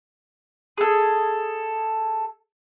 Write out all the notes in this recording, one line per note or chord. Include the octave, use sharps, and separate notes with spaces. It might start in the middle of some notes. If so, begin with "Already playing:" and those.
G#4 A4